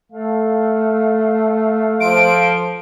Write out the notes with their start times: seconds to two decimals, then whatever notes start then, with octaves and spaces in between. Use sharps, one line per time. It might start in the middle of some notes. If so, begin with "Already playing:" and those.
0.12 A3 A4 F5
2.01 F3 D7